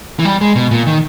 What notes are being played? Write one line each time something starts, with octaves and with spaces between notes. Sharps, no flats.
E3
G3
G#3
B2
A#2
D#3